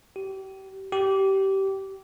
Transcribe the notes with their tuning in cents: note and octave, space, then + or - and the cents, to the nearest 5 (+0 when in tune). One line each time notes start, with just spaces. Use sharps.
G4 -30
G4 -20